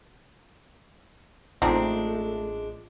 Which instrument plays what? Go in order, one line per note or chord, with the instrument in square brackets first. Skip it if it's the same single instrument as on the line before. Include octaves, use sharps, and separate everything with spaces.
[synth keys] A1 D#5 [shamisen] F3 C4 D#4 [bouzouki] G#3 D4 [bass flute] A3